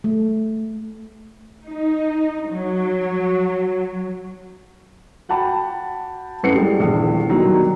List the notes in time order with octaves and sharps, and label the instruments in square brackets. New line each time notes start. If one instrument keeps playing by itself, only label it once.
[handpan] A3
[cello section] D#4
F#3
[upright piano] F#4 F#5 G5 A5 B5
F#2 A2 B4 F#5 C7 C#7
G3 G#3
D#1 A#1 E2
B2 D#3 F#3 G3 A#3